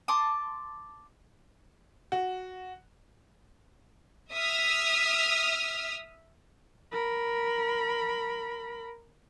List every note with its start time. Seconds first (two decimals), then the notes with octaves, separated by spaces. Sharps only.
0.08 A5 C6 D6 D#6
2.12 F#4
4.32 E5 D#6 F6
6.92 A#4 B5